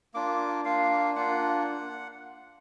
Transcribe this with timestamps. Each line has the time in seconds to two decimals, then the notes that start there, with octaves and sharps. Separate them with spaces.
0.14 A#3 D4 F4 D6
0.65 A#3 D4 F4 F5
1.15 A#3 D4 F4 F#5